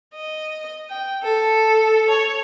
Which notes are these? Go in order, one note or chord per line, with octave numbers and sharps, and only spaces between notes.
D#5
G5
A4
C#5